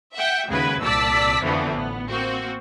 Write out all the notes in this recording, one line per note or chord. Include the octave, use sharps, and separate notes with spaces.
E5 F#5 G5
D#2 C#3 G#3 F#4 B4 G#6
C2 A#2 D5 A5 E6 B6
F2 D3 E3 F3 A3 B3
A1 B3
A#3 C4 F#4